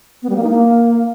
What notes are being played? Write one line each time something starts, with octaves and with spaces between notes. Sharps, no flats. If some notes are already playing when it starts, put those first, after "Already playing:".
B3
G3
A#3
D#4
A#3